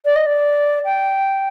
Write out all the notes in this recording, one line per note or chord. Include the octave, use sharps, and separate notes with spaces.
D5
D#5
D5
G5